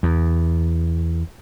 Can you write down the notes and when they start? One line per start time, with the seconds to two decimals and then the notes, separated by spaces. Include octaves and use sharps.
0.03 E2